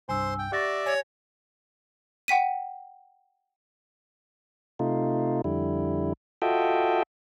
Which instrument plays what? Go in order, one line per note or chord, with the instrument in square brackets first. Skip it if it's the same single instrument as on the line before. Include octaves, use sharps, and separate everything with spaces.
[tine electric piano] C2 G2 [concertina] C5 C6 [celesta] G#5 E6
[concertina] G5
[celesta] G4 A6 A#6 [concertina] D5 E5 [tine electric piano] F#5 C#6
[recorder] C#5 [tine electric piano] G#5
[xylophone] F#5 G5 B6 D#7
[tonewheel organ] C3 A3 D#4 F4
F2 D3 G3 E4
F4 F#4 A4 D#5 E5 G5